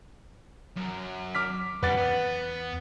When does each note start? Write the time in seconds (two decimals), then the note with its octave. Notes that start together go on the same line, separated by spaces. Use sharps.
0.76 F#2
1.35 D6 F6 B6
1.83 E2 G3 C#4 B4 F#5 A6
1.97 B3